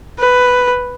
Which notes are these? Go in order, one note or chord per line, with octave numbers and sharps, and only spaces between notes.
B4